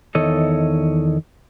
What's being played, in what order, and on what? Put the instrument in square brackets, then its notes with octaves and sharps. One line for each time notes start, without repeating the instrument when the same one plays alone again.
[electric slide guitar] E2 D#3 A4 C#5 D#5